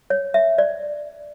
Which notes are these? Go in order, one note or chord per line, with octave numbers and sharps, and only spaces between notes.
C#5
E5
D5